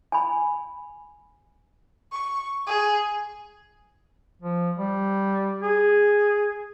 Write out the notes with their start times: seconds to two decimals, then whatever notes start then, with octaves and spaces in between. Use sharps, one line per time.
0.12 G#5 B5
2.12 C#6
2.67 G#4
4.42 F3
4.79 G3
5.63 G#4